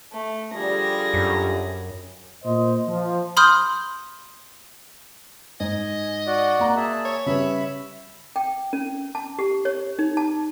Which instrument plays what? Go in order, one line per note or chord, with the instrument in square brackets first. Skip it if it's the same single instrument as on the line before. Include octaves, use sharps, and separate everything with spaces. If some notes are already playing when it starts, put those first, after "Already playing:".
[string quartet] A3
[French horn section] D3 F3 G3 [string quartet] G#4 A#6
[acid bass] F#2
[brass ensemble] A#2 C5 D#5
F3
[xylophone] B5 C6 D#6 F6 G6
[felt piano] G#2 [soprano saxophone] D#5 [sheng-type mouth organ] G#5
[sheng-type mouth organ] F#4 D5
[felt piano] A#3 A#5
[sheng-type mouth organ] G#4 E5 A5
[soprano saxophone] C#5
[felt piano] C#3 G3 B4 [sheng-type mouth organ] E5 B5
[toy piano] G5
C#4
A5
G4
C#5
D#4
A5